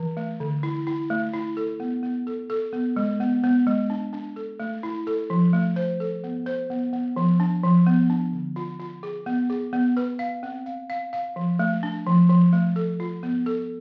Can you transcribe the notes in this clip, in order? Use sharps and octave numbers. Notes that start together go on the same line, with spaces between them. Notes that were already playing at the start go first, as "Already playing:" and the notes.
Already playing: E3
A3
D3
E4
E4
A3
E4
A4
B3
B3
A4
A4
B3
G#3
B3
B3
G#3
D4
D4
A4
A3
E4
A4
F3
A3
C5
A4
B3
C5
B3
B3
F3
D4
F3
B3
D4
D3
F4
F4
G#4
B3
G#4
B3
B4
F5
C4
F5
F5
F5
F3
A3
D4
F3
F3
A3
A4
F4
B3
A4